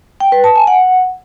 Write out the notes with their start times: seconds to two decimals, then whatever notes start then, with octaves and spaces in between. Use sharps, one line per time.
0.20 G5
0.32 B4
0.44 A5
0.56 G#5
0.67 F#5